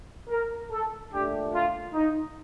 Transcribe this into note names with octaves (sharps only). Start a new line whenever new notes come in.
A#4
A4
A#2 A3 D4 G4
F4
D#4